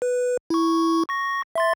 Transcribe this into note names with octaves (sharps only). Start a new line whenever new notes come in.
B4
E4 C#6
C#6 A#6
E5 C6 A6